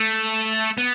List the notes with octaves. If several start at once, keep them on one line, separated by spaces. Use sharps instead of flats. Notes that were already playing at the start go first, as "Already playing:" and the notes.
Already playing: A3
B3